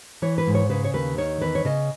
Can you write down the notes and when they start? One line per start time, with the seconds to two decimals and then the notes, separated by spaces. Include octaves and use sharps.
0.22 E3 C#5
0.38 B4
0.47 G#2
0.54 C#5
0.70 C#3 B4
0.85 C#5
0.94 D#2 B4
1.18 D#3 C#5
1.41 E2 B4
1.55 C#5
1.65 C#3 D#5